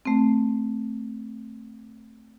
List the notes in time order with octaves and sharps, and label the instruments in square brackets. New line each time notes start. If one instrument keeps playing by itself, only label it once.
[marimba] A3 C4